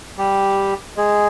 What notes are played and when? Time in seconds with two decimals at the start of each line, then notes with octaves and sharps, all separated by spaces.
0.18 G3 G4
0.97 G#3 G#4